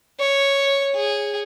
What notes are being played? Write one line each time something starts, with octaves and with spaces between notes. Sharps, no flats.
C#5
G#4